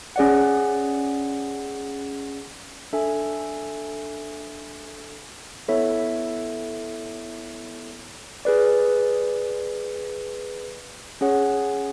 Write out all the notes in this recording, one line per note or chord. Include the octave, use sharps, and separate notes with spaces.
C#4 G#4 D5 F#5
D4 A4 E5 G#5
B3 E4 A4 C#5 E5
G#4 B4 D5
C#4 G#4 C#5 F#5